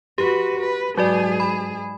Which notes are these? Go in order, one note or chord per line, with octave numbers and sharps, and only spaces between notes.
F#4 G4 B4
B4
G#2 F#3 F#4 G#4 D5
B5